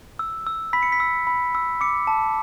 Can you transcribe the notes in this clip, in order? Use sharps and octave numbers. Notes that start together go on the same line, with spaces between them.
E6
E6
B5 B6
C#7
B6
E6
B5
E6
D6 C#7
A5